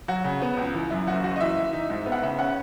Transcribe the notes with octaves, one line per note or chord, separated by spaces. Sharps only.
F#3 F#4
C#3
B3
C#2
E3
F#2 E4
F#1 F#4
F#1 F#4
D#5
E3 E5
E3
D#4
G#2
B3
F#5
C#3 E5
C#4 F#5